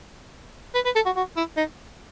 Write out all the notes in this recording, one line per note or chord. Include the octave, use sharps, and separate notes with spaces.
B4
B4
A4
F#4
F#4
E4
D#4